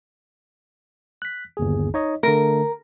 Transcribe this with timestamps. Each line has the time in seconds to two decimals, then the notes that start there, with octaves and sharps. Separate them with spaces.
1.22 F#6 B6
1.57 G1 D#2 G#4
1.94 D#4 C#5 D#5
2.23 D3 A3 A#4